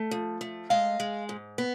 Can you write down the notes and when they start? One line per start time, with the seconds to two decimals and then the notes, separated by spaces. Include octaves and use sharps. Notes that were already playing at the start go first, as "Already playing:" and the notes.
Already playing: A3
0.11 F3
0.41 A3
0.70 G#3 D#5 F5
1.00 G#3
1.29 G#2
1.58 B3